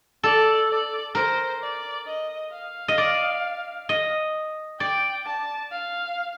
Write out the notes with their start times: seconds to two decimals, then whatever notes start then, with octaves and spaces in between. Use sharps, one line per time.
0.23 A4 D5
0.69 D5
1.14 A#4 C5
1.61 D5
2.06 D#5
2.52 F5
2.88 D#5
2.98 D5
3.89 D#5
4.80 D5 G5
5.26 A5
5.71 F5